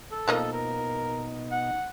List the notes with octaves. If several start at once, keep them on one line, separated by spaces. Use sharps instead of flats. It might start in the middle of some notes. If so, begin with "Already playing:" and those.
A4
B2 F3 A#3 D#4 D#5
A#4
F#5